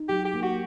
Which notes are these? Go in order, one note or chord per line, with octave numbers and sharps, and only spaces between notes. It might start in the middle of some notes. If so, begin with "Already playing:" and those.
Already playing: D#4
F#3 G4
G4
A#3
F#4